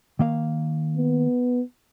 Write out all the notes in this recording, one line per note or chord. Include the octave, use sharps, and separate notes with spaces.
D#3 A#3 F5
B3